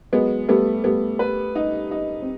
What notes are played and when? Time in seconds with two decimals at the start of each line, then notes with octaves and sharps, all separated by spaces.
0.13 F#3 G#3 B3
0.48 G3 A3 B3
0.84 G3 A3 B3
1.19 B4
1.55 D#4
1.91 D#4
2.22 C4